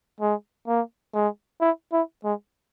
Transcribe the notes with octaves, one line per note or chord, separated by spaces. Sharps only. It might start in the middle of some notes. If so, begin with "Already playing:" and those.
G#3
A#3
G#3
E4
E4
G#3